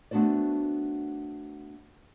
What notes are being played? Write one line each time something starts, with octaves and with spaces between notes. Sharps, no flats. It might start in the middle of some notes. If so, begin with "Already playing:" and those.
A3 B3 D4 F#4 C5 D5